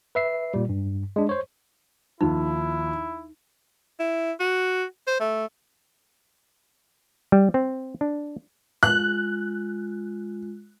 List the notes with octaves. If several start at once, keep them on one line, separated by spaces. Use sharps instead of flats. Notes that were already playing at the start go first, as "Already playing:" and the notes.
B4 E5 C7
A#2 G3
G2
G#3 D4
C5 C#5
D#2 F3 D#4 E4
E4
F#4
C5
A3
G3
C4
D4
G#3 F4 F#6